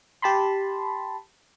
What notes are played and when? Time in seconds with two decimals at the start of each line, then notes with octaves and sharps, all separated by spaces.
0.22 G4 A5 B5 C6